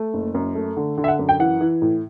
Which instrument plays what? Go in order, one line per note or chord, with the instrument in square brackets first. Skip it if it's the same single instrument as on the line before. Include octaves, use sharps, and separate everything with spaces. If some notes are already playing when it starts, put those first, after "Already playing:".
Already playing: [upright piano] A3
F#1
F#2
A3
D3
D3
E5
F#5
F#2
G5
E3 F#5
E3
A2